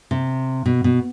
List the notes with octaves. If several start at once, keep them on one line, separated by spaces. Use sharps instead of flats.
C3
B2
B2